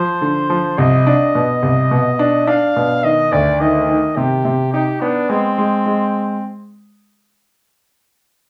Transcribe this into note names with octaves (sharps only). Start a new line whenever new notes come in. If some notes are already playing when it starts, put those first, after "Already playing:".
Already playing: F3 C5
D3
F3
C2 D#5
D4
B2
C2
B2
D4
D4 F5
B2
D#3 D#5
D2 D5
D#3 D#5
D#3
C3 G4
C3
D#4 G4
B3 D4
G#3 C4
G#3
G#3